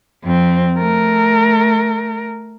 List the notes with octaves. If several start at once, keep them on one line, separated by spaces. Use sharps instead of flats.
F2 C4
A3 A#4